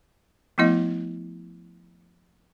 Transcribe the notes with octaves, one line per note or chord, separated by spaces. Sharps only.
F3 A3 B3 E4 D#5